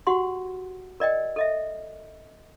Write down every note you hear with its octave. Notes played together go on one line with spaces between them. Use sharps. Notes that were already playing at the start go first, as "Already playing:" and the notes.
F#4 G4 F#5 C6
A#4 D5 D#5 G5
A4 D#5 E5